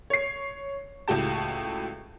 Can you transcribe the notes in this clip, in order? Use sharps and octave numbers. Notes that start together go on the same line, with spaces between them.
C#5 C7
C#2 A2 F#4 G4 A5